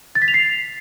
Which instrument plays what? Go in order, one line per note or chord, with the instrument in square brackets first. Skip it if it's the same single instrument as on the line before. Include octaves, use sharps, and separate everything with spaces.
[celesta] A6
B6
F7
C7